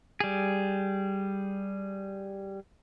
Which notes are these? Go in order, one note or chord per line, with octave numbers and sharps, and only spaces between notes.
G3 G#4